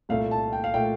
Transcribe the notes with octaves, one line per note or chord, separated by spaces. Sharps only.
C2 A#2 A3 F5
A5
G5
F5
A#2 A3 G5